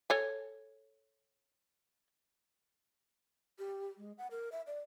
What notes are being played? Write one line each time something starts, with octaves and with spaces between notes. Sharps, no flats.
A4 C#5 G#5
G4
G#3
F#5
A#4
E5
D5